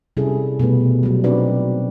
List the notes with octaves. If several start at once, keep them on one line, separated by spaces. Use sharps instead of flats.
C3 G3 C#4 E4 G#4 A4
B2 G3 A3 A4 B4
F#3 G3
C4 D4 D#4 F#4 B4 D5